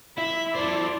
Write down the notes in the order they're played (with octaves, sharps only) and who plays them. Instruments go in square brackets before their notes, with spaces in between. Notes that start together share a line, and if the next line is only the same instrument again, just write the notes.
[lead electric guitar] E4 [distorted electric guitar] E5 [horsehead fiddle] B5
[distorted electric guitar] A4 C5 [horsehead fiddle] D5